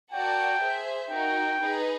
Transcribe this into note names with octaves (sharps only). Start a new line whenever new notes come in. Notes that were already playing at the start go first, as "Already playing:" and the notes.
F#4 A#4 D5 F#5 G5 A5
G#4 C5 E5
D#4 F#4 A#4 G5
D#4 G#4 B4